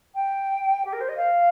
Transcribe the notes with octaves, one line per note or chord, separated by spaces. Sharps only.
G5
G4
A#4
C5
D#5
F5